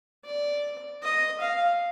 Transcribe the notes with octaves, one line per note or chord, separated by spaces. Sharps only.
D5
D#5
F5